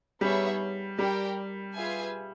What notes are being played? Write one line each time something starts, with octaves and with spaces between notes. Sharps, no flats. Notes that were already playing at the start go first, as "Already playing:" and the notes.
G3 B3 D#4 G#4 C#5 E5
G3 G4 A#4 D5 G5
F4 G#4 B4 E5 G#5